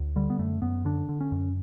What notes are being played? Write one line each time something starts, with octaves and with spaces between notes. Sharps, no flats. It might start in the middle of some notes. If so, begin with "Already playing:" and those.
Already playing: D2
D3 G3
B3
F#2 A3
F#2 B3
D3 D4
D3
C#4
F#2